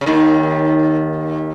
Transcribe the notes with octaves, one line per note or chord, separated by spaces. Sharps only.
C#3
D#2 D#3